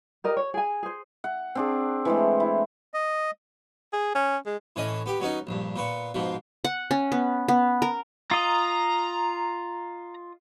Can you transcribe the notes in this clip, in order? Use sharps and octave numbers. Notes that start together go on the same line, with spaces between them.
G4 A#4 D#5
C#5
G#4 G#5
G#4 C5
F#5
C4 D4 G#4
E3 G#3 A3
E4
D#5
G#4
C#4
G#3
A2 E3 C#4 D#5 D#6
B3 G4
F#3 B3 C#4 D#4
A#1 G2
A#2 B3 C#6
G#2 B2 F3
F#5
C#4
B3
B3
A#4
F4 D#5 A#5